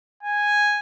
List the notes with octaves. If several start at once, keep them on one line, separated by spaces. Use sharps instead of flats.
G#5